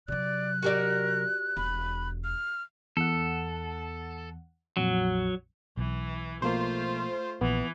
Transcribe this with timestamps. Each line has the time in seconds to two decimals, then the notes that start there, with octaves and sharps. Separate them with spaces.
0.08 C3 F#3 D5 F#6
0.62 F#4 G4 A#4 D5
1.57 E1 B5
2.24 F6
2.97 E2 A4 F#5
4.77 A#1 F2 F#3
5.77 B1 E3
6.42 B2 F3 A3 A#3 F4 C5
7.41 A#1 E3 B3